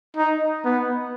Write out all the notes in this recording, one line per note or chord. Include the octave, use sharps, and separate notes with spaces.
D#4
B3